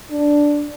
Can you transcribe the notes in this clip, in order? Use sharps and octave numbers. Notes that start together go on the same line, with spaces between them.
D4